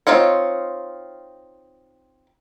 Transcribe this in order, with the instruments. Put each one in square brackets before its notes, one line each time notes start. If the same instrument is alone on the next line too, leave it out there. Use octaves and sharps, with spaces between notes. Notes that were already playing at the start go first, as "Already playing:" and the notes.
[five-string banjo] C4 D#4 F4 C#5